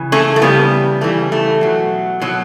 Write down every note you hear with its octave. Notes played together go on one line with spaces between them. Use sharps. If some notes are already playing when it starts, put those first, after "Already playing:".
Already playing: C#3 E3
A3 C#4
A3
C#3 E3 G3 B3
C#3 E3 G3 A3
A3
B2 F#3
B2 F#3